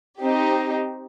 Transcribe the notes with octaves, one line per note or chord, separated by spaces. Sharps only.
C4 D#4 G4